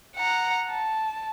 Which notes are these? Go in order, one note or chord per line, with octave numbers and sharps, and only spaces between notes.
F#5 A#5
A5